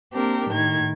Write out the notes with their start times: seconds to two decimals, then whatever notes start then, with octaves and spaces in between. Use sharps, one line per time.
0.13 A#3 C4 D4 G4 A#4
0.49 A2 D#3 G#6